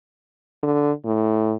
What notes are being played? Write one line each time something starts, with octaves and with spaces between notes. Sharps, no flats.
D3
A2